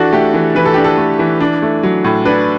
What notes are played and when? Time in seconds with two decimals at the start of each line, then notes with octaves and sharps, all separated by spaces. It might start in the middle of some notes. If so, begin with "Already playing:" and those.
Already playing: E3 D4 F#4 A4
0.13 A3 G4
0.34 E3
0.55 E3 B4
0.66 A4
0.74 D4 G4
0.84 A4
0.97 A3
1.19 E3
1.40 D4
1.62 A3
1.83 F#3
2.04 A2
2.25 D4 B4